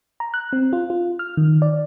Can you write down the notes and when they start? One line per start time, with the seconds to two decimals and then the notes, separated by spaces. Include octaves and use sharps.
0.20 A#5
0.34 F#6
0.53 C4
0.73 F4
0.90 F4
1.19 F6
1.37 D#3
1.62 D5